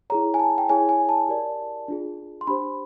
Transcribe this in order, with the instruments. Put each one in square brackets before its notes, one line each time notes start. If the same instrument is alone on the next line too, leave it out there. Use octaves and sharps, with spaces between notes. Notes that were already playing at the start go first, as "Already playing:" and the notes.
[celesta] E4 G#4 C#5 A#5
G#5
A5
G5
E4 G#4 C#5 G#5
G#5
A5
G4 A#4 D5
D4 F4 G#4
C6
D4 G4 C5 B5